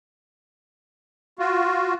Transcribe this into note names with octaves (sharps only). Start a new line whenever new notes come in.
F4 F#4